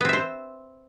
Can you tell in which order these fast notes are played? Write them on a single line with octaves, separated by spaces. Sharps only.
B3 C4 E5 C5